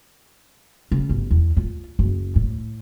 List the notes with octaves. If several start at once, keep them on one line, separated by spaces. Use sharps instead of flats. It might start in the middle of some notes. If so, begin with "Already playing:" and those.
C#3
G1
E2
F4
F#1
A2